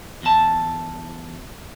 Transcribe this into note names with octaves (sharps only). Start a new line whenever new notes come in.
E2 A5